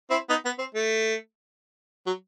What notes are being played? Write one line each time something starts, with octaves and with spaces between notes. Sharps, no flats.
C4 E4
B3 D#4
B3
C4
A3
F#3